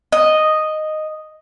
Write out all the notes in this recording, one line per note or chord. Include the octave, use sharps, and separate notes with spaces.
D#5